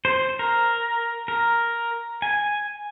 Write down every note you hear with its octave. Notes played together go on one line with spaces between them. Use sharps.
C5
A#4
A#4
G#5